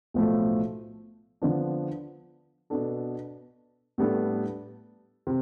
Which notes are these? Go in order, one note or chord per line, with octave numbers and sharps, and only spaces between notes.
B1 A2 F3 A3
D3 F3 B3 D4
B2 B3 D4 A4
A2 G3 B3 D4 A4
C3